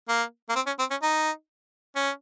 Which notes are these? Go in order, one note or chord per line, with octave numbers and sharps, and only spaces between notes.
A#3
A#3
C4
C#4
C4
C#4
D#4
C#4